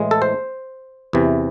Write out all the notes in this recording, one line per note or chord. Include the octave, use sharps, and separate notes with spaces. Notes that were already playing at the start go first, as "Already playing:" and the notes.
Already playing: A2 E3 G#3
A4
C5
E2 C3 E3